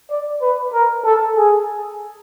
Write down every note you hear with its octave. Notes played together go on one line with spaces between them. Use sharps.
D5
B4
A#4
A4
G#4